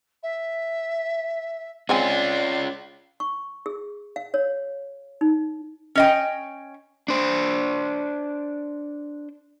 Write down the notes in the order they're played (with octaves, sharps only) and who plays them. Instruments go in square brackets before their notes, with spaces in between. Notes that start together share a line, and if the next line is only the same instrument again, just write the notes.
[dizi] E5
[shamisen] G#3 C4 G#5 [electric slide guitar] C#4 F4 [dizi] D5
[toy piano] C#6
G#4
F5
C#5
D#4
[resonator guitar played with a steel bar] C#4 D#5 G5
[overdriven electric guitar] D4 C5